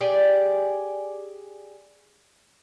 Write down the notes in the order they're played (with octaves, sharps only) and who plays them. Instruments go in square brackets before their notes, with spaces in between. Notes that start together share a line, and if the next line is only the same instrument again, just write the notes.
[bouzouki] G4 G#4 D5